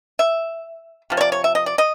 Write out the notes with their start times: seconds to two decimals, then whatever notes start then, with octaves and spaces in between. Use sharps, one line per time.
0.19 E5
1.10 C3 F3
1.17 C#5
1.21 D5
1.32 C#5
1.44 E5
1.55 D#5
1.66 D5
1.78 D#5